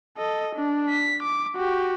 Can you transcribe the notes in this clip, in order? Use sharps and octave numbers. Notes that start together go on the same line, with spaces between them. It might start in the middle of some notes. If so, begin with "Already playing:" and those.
A4 D#5
D4
B6
D6
F#4 G4